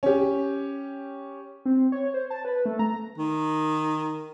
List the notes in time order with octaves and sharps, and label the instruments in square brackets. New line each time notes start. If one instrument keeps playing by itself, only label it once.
[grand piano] C#4 G4
[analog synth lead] C4
C#5
C5
A5
B4
A3
A#5
[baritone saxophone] D#3